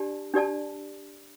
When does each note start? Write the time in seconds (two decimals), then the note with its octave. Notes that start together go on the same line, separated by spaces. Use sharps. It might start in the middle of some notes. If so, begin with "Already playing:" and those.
Already playing: D4 G4 D5 A5
0.34 D4 G4 D5 A5